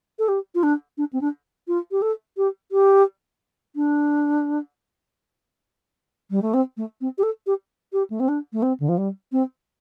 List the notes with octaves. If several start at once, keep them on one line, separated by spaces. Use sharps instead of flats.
A4
G4
F4
D4
D4
C4
D4
F4
G4
A4
G4
G4
D4
G3
A3
C4
A3
C4
G4
A4
G4
G4
A3
C4
D4
A3
C4
D3
F3
G3
C4